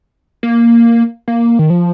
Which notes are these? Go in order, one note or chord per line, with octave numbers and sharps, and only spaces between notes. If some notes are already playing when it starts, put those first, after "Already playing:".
A#3
A#3
D#3
F3